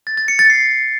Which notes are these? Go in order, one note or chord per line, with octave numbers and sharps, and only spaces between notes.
A6
A6
C#7
A6
C7